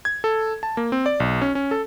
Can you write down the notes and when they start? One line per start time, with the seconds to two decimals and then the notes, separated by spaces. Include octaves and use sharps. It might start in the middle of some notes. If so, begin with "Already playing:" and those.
0.05 G#6
0.24 A4
0.63 A5
0.77 A#3
0.92 C4
1.06 D5
1.20 B1
1.41 C#4
1.55 C#4
1.71 A4